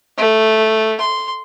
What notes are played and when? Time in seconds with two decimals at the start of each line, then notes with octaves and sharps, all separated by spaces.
0.18 A3
1.00 C6